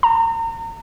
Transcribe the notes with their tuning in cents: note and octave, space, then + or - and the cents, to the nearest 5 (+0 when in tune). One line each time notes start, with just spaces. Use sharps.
A#5 -35